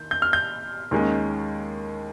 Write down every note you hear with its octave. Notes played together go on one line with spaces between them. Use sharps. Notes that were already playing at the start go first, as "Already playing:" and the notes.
Already playing: D#3 G6
G6
F6
G6
D#2 D#3 G#3 C#4